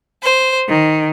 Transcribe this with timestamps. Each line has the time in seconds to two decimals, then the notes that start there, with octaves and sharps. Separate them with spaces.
0.22 C5
0.69 D#3